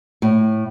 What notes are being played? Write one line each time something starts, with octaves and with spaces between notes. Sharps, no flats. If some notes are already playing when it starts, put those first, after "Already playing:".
A2